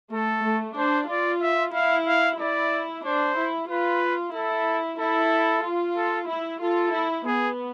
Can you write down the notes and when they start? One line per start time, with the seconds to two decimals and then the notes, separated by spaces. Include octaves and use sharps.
0.13 A3 A4
0.45 A3
0.77 D4 C5
1.09 F4 D5
1.42 E5
1.74 E4 F5
2.07 F5
2.39 E4 D5
3.05 D4 C5
3.37 E4
3.69 F4 B4
4.35 E4 A4
4.99 E4 A4
5.65 F4
5.97 A4
6.30 E4
6.61 F4 A4
6.94 E4
7.27 B3 G#4